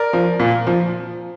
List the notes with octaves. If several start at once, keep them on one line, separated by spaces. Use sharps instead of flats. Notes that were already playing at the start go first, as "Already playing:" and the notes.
Already playing: A#4 D5
F3
A#2
F3